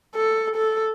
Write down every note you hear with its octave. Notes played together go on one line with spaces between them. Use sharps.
A4
A4